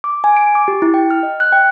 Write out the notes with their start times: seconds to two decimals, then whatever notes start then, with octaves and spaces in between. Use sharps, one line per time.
0.04 D6
0.24 G#5
0.37 D7
0.55 D6
0.68 G4
0.82 E4
0.94 G5
1.10 F6
1.23 D#5
1.40 F#6
1.52 G5